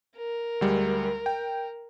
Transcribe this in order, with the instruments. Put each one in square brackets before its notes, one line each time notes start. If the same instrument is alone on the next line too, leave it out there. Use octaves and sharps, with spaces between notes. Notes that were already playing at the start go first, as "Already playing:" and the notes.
[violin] A#4
[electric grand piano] D2 G3 G#3
G5